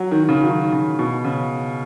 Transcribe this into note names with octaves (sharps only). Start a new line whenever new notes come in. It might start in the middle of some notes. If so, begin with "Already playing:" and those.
Already playing: F#3
D#3
D#3
C#3
F#3
D#3
C#3
B2
C#3